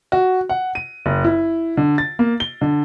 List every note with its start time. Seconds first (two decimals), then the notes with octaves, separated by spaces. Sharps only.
0.12 F#4
0.49 F#5
0.75 D#7
1.06 F#1
1.24 E4
1.77 D3
1.98 A6
2.19 A#3
2.40 G7
2.61 D3